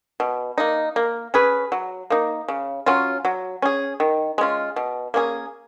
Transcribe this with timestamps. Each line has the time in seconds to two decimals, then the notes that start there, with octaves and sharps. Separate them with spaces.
0.20 B2
0.58 A#3 D#4
0.96 A#3
1.34 C#4 G#4 B4
1.72 F#3
2.10 A#3 D#4
2.48 C#3
2.86 F#3 C#4 F4
3.25 F#3
3.62 C#4 G#4
4.00 D#3
4.38 G#3 C#4 F4
4.76 B2
5.14 A#3 C#4 G#4